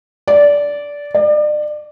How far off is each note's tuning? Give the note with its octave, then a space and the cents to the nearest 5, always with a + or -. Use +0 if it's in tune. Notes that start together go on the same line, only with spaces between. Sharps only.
D5 -15
D5 +35